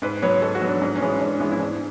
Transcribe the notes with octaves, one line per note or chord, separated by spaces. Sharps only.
G#2 B4
F#3 B3 C#5
G#2 A4
F#4
F#3 B3
D4
G#2 C#4
C#4
E3 G#3 B3 D4
G#2 D4
E3 G#3 B3
E4
G#2 D4